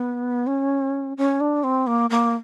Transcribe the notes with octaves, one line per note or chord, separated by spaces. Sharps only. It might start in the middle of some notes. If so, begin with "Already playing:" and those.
Already playing: B3
C#4
C#4
D4
C4
A#3
A#3